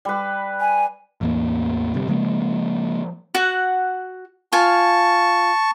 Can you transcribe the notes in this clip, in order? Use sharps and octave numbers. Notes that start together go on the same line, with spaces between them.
G3 B4
G#5
A1 E2 A#3
G1 C3 G3
C#3 F3 G#3 A#3
F#4 F#5
F4 F5 G#5 A5 C#6